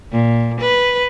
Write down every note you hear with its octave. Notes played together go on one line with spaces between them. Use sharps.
A#2
B4